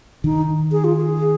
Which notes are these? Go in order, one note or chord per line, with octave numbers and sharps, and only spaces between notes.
D#3 D#4
G#4
F4
G#4